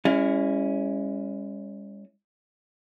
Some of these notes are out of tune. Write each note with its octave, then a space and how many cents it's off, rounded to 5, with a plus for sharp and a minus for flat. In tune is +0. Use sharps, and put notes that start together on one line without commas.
G#3 -45 C#4 +0 E4 +0